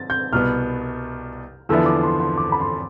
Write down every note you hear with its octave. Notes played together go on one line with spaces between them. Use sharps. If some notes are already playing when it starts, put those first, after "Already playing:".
Already playing: A6
G6
C2 B2 B3 F6
E2 D3 F3 B3 E4 E6
D6
C6
C6
D6
B5
C6